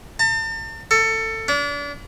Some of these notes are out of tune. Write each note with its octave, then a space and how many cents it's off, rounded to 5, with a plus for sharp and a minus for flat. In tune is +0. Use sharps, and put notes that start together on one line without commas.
A5 +40
A4 +20
D4 -35